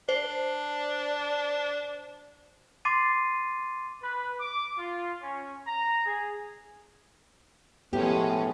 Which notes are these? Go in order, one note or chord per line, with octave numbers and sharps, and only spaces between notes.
D4 C5
C6 D6 A6 C7 D#7
B4
D6
F4
C#4
A#5
G#4
A2 F3 G#3 B3 C#4 G4